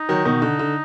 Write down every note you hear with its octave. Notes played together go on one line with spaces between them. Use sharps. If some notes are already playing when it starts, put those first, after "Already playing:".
Already playing: D#4
D#3 F#3
B2 D#3
D3
D3